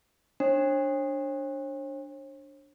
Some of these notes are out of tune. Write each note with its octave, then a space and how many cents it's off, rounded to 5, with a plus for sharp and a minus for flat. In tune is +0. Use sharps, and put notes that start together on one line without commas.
D4 +0 C#5 -45